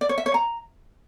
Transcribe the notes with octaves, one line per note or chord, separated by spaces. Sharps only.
D5
C#5
E5
C#5
A#5